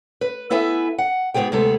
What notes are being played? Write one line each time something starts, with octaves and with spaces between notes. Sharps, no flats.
B4
B3 E4 A4 B4 E5 G#5
F#5
G#2 B2 A#3 B3 G#4 G5
D2 C3 G#3 B3 A4